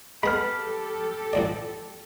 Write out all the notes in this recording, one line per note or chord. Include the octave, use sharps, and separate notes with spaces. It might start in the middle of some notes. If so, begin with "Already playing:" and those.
G#3 B3 G4 A4 B5 F6
A1 D2 D5